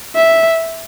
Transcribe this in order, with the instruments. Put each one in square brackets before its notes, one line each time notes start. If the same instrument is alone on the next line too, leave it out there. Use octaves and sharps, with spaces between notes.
[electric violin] E5